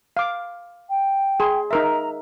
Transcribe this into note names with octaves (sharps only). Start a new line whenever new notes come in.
F5 D6
G5
G#4 C6
D#4 A#4 E5 A#5